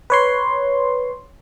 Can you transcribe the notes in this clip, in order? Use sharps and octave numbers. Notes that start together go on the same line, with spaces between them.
B4 C#5 C6